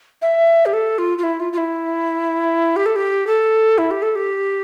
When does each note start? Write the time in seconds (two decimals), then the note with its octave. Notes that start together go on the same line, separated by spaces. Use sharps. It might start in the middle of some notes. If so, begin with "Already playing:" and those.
0.22 E5
0.66 G4
0.73 A4
0.98 F4
1.18 F4
1.23 E4
1.40 F4
1.53 F4
1.58 E4
2.76 G4
2.86 A4
2.96 G4
3.27 A4
3.78 E4
3.91 G4
4.02 A4
4.15 G4